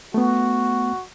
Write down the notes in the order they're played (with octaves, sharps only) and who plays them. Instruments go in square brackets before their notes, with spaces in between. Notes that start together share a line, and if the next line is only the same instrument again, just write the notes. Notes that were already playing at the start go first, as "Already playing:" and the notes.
[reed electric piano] A3 B3 [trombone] F#4